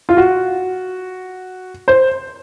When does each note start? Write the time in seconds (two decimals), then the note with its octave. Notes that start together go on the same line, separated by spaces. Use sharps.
0.09 F4
0.17 F#4
1.88 C5